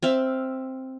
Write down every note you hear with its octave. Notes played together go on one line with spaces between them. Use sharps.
C4 E5 F5